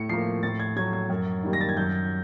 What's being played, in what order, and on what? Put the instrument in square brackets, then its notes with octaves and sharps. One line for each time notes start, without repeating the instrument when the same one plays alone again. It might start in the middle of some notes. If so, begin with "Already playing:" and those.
Already playing: [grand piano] A2 C#7
F3 A#3 C7
A2 A6
G#6
F#3 A3 G#6
G#6
F#2
D#3 G3 A#3
A#6
A6
G#6
F#2 G6